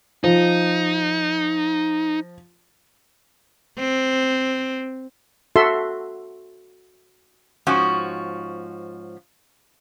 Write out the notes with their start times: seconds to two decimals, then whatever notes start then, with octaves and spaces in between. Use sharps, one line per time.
0.24 F3 D#4
3.79 C4
5.56 F#4 A4 E5 C6
7.67 G#2 F3 C#4 F#4